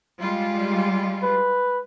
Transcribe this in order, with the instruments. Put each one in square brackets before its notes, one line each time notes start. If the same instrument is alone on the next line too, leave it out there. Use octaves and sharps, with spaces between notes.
[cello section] G3 G#3 F4
[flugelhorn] B4